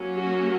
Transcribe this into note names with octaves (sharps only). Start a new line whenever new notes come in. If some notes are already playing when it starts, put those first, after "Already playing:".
Already playing: F#3 A#3 C#4
F#4